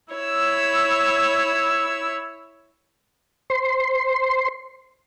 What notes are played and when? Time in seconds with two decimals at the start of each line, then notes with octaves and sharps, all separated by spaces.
0.13 E4 C#5 E6
3.50 C5 C6